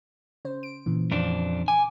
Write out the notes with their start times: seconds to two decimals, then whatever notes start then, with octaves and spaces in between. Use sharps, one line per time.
0.45 C#3 C5
0.63 D7
0.86 A#2 C#3 E3
1.12 F2 D4
1.68 G#5 D6